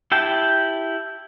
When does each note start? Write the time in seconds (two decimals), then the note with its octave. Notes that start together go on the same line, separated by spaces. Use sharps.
0.12 E4 G4 G5 A5